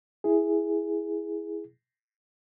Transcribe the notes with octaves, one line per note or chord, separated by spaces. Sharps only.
E4 G#4